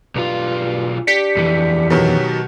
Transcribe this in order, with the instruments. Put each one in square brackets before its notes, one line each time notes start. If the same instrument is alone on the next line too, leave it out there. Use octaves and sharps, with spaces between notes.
[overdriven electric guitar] B1 F4 [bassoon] G2
[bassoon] D4 [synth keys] G4 B6 C#7
[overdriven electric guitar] F2 E3
[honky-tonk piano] B2 D#3 F#3 [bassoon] C#4